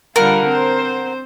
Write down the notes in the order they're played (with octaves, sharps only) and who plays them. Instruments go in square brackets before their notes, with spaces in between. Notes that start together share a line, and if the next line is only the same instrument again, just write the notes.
[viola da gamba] D3 G3 F4 [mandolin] A#4 F#5
[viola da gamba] C4 C5